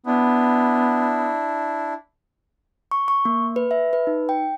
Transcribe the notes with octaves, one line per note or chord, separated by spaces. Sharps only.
B3 D4 E4
C#6
C#6
A#3
B4
E5
B4
D#4
G5